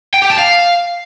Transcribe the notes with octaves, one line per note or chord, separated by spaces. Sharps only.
G5
G4
A5
F5